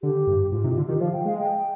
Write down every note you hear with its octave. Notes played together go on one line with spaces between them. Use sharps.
D3 G4
G2
G#2 F4
C3 D#4
G4
D3 F4
D#3 G4
F3 F5
G5
G#3 F5
G5